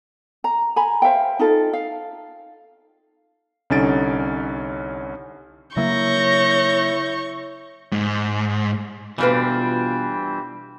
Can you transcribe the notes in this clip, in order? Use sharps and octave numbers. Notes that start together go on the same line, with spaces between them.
A#5
G#5 A#5 B5
C5 E5 F5 G5
D#4 F4 A4
F5
C2 D3 C#4 D#4 A6 D7
C#3 F#3 A#3 E4 C#5 C#6 G6 A#6
G#2
B2 E3 G3 C4 D4 F4 B4